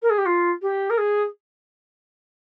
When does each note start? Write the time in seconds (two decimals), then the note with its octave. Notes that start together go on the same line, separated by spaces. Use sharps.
0.02 A#4
0.10 G#4
0.18 G4
0.25 F4
0.62 G4
0.90 A#4
0.98 G#4